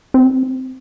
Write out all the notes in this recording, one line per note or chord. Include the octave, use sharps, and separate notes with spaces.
C4